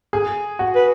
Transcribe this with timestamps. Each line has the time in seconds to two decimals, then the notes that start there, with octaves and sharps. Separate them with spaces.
0.13 G#4
0.59 F#4
0.75 B4